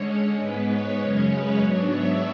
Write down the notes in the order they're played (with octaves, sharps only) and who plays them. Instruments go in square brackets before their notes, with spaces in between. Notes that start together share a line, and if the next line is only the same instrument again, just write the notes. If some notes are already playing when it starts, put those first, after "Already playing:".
Already playing: [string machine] D3 G#3 C#4 C#5
G#2 G#3 B3 B4
C#5
F#2 C#3 G#3 C#4
B4
G#2 F#3 B3 D4 C#5
E5